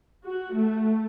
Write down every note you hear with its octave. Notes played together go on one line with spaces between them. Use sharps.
F#4
A3